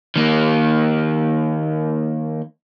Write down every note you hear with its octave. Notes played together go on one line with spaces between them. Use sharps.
D#3 A#3